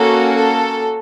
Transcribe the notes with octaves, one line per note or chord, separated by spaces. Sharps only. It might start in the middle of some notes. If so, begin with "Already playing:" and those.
Already playing: A#3 C#4 F#4 A4
A4